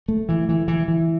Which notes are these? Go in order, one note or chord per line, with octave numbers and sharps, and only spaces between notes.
A3
E3
E3
E3
E3